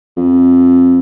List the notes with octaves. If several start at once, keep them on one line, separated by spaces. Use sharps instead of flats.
F2